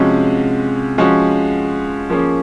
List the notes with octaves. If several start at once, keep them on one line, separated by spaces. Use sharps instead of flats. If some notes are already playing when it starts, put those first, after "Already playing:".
Already playing: C3 F3 G#3 C#4 F#4
F3 G#3 C#4 F#4
F3 A#3 C#4 G#4